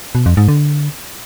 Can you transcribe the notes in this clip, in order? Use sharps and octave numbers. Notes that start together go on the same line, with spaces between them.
B2
F2
G#2
D3